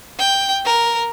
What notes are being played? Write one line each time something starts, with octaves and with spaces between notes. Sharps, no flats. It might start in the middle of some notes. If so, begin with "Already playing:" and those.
G5
A#4